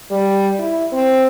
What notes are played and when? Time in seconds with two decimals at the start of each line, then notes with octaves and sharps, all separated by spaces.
0.11 G3
0.59 E4
0.92 C4